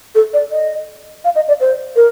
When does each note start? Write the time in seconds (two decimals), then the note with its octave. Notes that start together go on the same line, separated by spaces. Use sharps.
0.15 A4
0.33 D5
0.51 D#5
1.24 F5
1.36 D#5
1.48 D5
1.60 C5
1.96 A#4